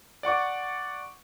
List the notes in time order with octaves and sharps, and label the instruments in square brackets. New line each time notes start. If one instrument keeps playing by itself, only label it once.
[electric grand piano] D5 F#5 C#6 D6